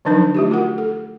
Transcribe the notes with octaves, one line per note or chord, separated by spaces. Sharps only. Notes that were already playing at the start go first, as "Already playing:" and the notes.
D3 F3 F#3 D4 D#4 B4
A3 F4 G4
F#4 A#4 F#5
A4